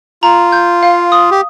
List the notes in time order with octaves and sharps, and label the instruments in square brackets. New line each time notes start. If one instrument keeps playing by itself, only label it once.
[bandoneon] F4 [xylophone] A#5
[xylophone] G6
F5
D#6
[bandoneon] G4